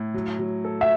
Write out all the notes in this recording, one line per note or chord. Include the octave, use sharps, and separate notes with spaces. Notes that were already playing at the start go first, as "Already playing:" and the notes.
Already playing: A2
F#3
F#3
A4
E5